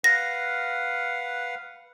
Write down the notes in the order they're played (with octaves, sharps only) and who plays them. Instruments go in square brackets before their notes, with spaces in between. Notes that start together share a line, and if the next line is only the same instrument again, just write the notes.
[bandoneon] B4 F5 F#5 [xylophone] A#6